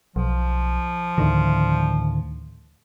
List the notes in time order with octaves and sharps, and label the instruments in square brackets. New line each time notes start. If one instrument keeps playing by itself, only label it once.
[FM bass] B1 [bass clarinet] F3
[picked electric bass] D2 A2 D3 [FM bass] D#3